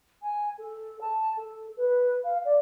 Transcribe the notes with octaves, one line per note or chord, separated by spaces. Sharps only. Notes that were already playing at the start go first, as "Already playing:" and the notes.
G#5
A4
A5
A4
B4
F5
D5